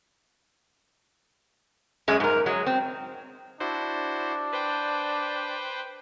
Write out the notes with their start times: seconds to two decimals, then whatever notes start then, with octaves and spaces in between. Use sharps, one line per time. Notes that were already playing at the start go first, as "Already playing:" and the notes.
2.08 F#2 G#3
2.20 G#2 A#4
2.46 F#3 G#3
2.66 C4
3.60 D4 E4 F#4 C5
4.53 B4 C5 G5